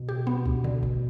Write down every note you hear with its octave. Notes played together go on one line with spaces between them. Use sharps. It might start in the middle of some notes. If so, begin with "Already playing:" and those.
Already playing: B2
G4
B3
D2
D3
A1